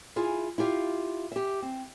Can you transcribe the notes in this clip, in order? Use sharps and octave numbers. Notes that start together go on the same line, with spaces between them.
E4 F4 G#4
E4 F4 G4 F5
G4 E5
C4